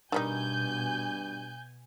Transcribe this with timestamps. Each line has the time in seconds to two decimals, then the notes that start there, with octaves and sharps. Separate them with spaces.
0.12 G2 B2 D#3 G3 D#4 G#5 G6